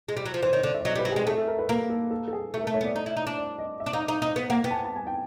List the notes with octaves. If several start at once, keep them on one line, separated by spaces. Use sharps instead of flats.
G#3
G3
F#3
F3
E3 C5
D#3 C#5
D3 D5
E5
D5
F#3 D#5
G3
B4
F#3
G4
G#3 G#4
A3 G#4
A4
A#4
B4
A#3 A#4
A4
A4
A4
G#4
A3 A4
A#4
A3
C#5
B3 D5
D#4
E4
D#4
D4
D5
D#5
E5
D4
D#4 F5
D#4 E5
D#4 D#5
B3
A#3 F#5
B3 G5
A5
G#5
A5
G#5
G5